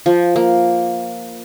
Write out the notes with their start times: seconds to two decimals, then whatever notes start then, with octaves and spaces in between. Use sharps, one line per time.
0.06 F3
0.36 A#3